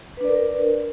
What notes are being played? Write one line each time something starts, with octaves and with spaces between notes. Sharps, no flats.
D4 A#4 B4 D5